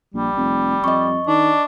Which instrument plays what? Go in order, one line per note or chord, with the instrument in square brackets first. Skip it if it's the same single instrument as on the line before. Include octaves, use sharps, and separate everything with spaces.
[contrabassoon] A#1 [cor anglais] G3
[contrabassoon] F1
[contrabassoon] F2 [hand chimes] D#5 C#6
[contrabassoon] D#3 [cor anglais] D4